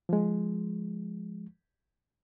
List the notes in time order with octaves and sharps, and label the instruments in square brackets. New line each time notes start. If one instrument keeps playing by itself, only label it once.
[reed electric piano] F3 G#3